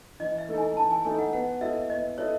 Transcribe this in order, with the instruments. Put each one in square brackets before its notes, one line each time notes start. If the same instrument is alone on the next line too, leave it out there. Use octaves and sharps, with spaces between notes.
[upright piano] E3 [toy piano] D#5
[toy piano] E5
[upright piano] A3 D#4 A4
[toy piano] G#5
[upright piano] E3 [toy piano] A5
[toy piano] G#5
[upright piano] A3 D#4 A4 [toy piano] G#5
[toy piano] F#5
[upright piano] B3 [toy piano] F#5
[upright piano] E4 A4 D#5 [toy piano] E5
[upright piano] B3 [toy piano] D#5
[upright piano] E4 A4 D#5 [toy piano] C#5